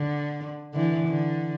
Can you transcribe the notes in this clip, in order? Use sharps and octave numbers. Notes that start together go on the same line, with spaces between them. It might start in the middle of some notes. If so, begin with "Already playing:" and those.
Already playing: D3
D3 E3
D3